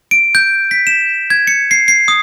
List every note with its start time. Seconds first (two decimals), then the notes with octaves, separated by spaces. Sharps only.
0.11 D7
0.35 G6
0.71 B6
0.87 E7
1.30 G#6
1.47 C#7
1.71 C7
1.88 C7
2.08 D#6